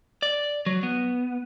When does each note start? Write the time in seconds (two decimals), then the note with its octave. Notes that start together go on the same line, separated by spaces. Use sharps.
0.22 D5
0.66 F#3
0.83 B3